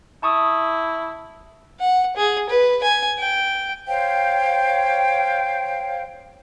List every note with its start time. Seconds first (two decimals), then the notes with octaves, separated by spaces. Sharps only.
0.23 E4 A5 C#6 D#6
1.80 F#5
2.16 G#4
2.49 B4
2.83 G#5
3.18 G5
3.88 C5 C#5 F5 G5